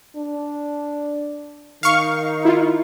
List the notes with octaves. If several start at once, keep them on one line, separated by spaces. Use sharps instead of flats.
D4
D#3 D#4 F5 C#6
E4 F4